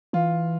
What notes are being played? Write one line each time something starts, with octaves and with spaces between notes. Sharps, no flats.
E3 F4